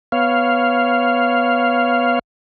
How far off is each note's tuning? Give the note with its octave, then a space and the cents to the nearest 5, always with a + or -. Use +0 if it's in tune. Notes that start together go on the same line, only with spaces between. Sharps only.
B3 +0 C#5 +0 F5 -5